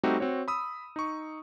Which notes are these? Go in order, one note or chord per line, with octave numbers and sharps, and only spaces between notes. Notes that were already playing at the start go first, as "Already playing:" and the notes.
G3 A3 C4 D#4 F#4 G4
C4 F#4 C#5
B5 D#6 E6
D#4 C#6